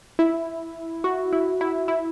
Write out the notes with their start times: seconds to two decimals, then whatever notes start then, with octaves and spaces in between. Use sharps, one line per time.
0.19 E4
1.04 F#4
1.33 E4
1.61 E4
1.88 E4